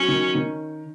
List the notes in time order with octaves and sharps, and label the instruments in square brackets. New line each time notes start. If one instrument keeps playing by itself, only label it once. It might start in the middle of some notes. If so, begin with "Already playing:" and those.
Already playing: [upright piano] F#3 [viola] C#4
[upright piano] D#3
D#3